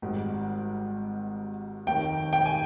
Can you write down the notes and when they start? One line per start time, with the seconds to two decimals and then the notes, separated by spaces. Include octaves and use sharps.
0.02 G#1 G#2 G3
1.86 F1 D#2 D#3 G5
2.33 G5
2.46 G#5